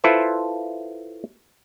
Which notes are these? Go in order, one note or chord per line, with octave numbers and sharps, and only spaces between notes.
E4 F4 A4 B4 C5 E5